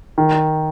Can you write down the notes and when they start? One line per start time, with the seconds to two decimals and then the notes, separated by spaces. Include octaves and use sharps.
0.18 D#3